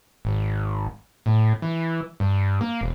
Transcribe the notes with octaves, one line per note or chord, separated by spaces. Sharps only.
G#1
A2
E3
G2
A#3
E1